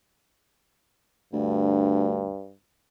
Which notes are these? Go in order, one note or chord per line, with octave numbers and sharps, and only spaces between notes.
D2 G2